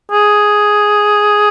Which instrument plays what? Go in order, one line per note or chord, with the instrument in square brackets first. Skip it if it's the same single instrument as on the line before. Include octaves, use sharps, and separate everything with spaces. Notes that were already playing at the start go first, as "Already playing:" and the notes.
[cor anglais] G#4